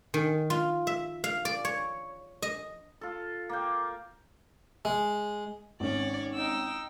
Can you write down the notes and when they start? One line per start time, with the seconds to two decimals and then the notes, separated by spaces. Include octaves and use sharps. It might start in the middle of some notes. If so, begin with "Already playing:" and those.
0.14 D#3
0.50 F4
0.87 E5
1.24 F5
1.45 D5
1.65 C#5
2.42 D#5
3.01 F4 A4
3.49 A#3 G5
4.85 G#3
5.80 G#1 C#4 C#5 D5
6.33 D#4 G5 E6